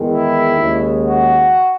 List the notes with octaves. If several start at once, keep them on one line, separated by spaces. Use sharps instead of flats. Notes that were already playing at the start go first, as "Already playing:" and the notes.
Already playing: E2 D#3 G#3
E4
D#2 C#3 G#3
F#4